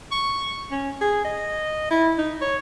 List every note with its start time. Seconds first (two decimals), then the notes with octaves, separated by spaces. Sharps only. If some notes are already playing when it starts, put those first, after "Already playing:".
0.12 C#6
0.71 C#4
1.01 G#4
1.25 D#5
1.90 E4
2.18 D#4
2.42 C#5